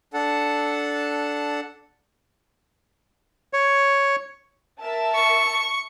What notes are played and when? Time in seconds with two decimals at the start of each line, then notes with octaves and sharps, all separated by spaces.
0.14 D4 A4 F#5 A5
3.53 C#5
4.83 A#4 E5 A5
5.15 C#6